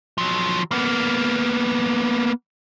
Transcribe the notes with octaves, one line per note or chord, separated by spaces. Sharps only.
F3 F#3
A#3 B3